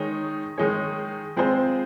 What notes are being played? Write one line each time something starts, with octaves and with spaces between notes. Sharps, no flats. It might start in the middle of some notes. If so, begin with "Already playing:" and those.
Already playing: D#3 G#3 D#4 C#5
D#3 G#3 D#4 G#4 C#5
G#3 C4 F4 G#4 C5